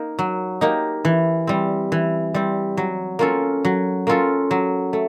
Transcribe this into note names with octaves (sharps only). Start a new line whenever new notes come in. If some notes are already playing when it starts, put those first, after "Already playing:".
Already playing: A#3 D#4
F#3
A#3 D#4 G4
E3
G3 C4
E3
G3 C4
F#3
A#3 C#4 F4 A4
F#3
A#3 C#4 F4 A4
F#3
A3